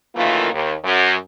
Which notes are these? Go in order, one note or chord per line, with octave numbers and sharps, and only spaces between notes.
F#2 D#3 E3 A3 A#3 F4
D#2
F#2